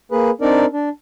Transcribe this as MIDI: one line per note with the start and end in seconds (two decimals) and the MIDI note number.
0.12 0.30 58
0.12 0.30 68
0.12 0.30 71
0.41 0.65 60
0.41 0.65 62
0.41 0.65 63
0.41 0.65 70
0.41 0.65 74
0.73 0.89 62